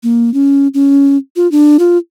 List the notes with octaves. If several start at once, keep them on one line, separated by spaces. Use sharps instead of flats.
A#3
C#4
C#4
F4
D4
F4